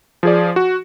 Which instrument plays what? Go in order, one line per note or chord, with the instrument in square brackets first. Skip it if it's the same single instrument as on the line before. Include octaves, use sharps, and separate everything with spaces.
[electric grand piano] F3 G#4 D5
F#4